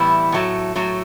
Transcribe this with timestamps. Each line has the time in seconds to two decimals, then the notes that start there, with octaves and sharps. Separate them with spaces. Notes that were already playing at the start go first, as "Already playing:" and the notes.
Already playing: A2 E3 G3 B3 E4
0.32 A2 F#3 A3
0.76 A2 F#3 A3